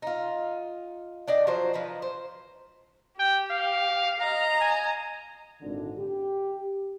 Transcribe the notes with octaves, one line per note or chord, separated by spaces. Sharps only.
D#4 F4
D4 D5 D#5 G5
F3 F#3 C5
F3 D#4 B4 A#5
C5
G4 G5
F5
D#5 F5 A#5
G#5
G#1 A#2 D3
G4